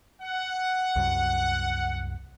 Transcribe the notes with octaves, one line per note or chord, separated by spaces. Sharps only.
F#5
C2 F#2